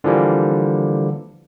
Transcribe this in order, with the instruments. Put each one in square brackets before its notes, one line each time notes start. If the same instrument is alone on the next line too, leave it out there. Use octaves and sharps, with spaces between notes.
[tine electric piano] D3 E3 F3 G3 A#3